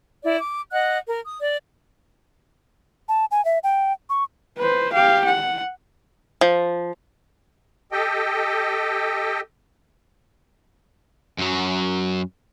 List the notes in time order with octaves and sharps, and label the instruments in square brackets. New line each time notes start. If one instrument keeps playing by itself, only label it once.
[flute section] E4 D5
D6
D#5 F#5 F#6
A#4
D#6
D5
[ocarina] A5
G#5
E5
G5
C#6
[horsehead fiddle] B4 C5
G4 F5
F#5
[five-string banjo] F3
[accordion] G4 A4 D#5 G5
[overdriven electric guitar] F#2 F#3